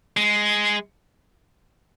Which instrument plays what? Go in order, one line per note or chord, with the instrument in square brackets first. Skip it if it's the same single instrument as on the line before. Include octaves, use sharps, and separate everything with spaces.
[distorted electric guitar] G#3